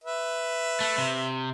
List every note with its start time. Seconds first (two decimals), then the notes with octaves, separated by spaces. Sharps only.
0.04 B4 E5
0.81 A3
0.98 C3